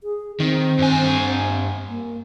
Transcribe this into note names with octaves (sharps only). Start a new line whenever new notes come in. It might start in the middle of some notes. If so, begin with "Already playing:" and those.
G#4
D#3 C4
G2 G#5
A#3